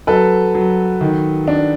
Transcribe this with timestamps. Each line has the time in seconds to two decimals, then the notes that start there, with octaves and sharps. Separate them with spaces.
0.07 F#3 A4 B4
0.55 F#3
1.01 D#3
1.48 D4